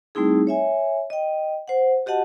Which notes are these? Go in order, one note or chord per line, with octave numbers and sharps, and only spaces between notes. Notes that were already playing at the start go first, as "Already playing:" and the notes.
G3 A3 C4 D#4 E4 G#4
C#5 E5 G#5
D#5 G5
C5 F#5
F#4 G4 D#5 F#5 A5